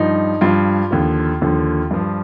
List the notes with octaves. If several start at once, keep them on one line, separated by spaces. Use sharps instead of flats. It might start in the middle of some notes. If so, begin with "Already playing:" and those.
Already playing: G2 F3 D#4
G2 F3 F4
D#2 D3 F3
D#2 D3 F3
G2 F3